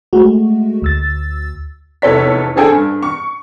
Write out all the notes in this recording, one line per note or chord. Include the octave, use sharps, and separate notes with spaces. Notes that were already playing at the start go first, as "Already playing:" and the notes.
G#3 A3 F#4
D2 E6 A6
F1 E2 A4 C#5 B6
C4 D4 G#4 A4 G5 G#5
G2
C#6